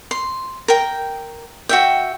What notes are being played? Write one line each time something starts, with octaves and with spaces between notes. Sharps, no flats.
C6
A#4 G5
F#4 E5 G5